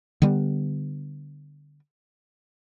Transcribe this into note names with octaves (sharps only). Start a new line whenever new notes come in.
D3 G3 B3